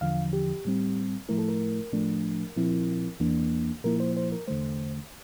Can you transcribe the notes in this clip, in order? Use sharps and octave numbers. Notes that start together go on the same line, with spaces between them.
E2 D3 F3 F5
G4
A2 G3 C4
A2 F3 A3 E4 A#4
A4
A#4
A2 F3 A3 D4
A#2 F3 C4 E4
E2 E3 A#3 D4
A#2 F3 A#3 E4 A#4
C5
C5
A#4
E2 D3 A3 C5